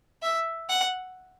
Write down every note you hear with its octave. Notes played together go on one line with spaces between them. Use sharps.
E5
F#5